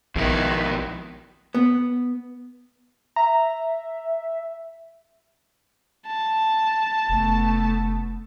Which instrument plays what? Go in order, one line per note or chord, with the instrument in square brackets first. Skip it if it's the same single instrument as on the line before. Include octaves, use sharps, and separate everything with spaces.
[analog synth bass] A#1 [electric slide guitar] F2 B2 E4 [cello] D#3 B4
[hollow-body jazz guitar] B3
[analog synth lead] E5 [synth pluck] A#5
[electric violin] A5
[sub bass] F1 [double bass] A3 B3